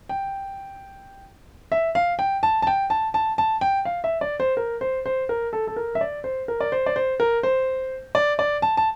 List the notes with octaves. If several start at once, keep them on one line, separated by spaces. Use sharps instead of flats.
G5
E5
F5
G5
A5
A5
G5
A5
A5
A5
G5
F5
E5
D5
C5
A#4
C5
C5
A#4
A4
A4
A#4
E5
D5
C5
A#4
D5
C5
D5
C5
A#4
C5
D5
D5
A5
A5